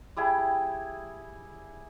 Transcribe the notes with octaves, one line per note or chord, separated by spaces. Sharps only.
G3 E4 G#4 G5